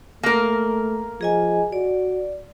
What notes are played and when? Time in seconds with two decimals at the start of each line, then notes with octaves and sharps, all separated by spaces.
0.23 A3 A#3 A#4
1.21 F3 G#4 D#5 G#5
1.72 F#4 D5